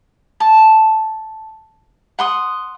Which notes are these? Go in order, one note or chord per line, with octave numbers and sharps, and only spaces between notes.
A5
F#5 C6 D#6